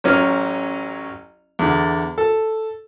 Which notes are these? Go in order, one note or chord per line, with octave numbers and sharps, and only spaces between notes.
A1 F#3 C#4 F6
E2 D3
A4